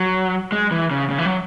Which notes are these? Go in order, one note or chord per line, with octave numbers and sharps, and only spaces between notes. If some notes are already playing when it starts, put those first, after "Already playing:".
Already playing: F#3
G#3
E3
C#3
C#3
E3
F#3